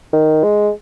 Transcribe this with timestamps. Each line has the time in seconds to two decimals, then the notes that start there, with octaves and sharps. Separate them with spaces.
0.13 D#3
0.44 G#3